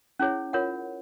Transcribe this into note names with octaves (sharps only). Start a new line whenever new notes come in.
C#4 E4 G#4 C#5
F4 A#4 C#5 F#5